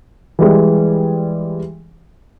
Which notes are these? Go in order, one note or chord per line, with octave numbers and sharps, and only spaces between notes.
E3 G3 G#3